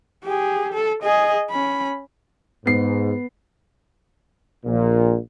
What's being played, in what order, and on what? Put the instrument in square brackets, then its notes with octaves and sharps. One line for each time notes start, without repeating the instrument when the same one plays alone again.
[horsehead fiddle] G4 G#4
A4
G#4 D#5
C#4 B5
[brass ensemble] G#2 [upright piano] B3 C7
[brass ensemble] A#1 A#2